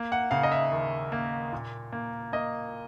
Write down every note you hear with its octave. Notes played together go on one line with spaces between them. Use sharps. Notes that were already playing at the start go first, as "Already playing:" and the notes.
Already playing: A#3
F#5
C#3 F5
D#5
E5
D#2
A#3
A#2
A#3
A#3 D#5